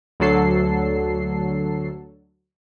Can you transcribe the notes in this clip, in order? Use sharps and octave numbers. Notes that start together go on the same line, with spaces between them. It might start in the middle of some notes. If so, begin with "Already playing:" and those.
D2 D3 F#3 A4 C7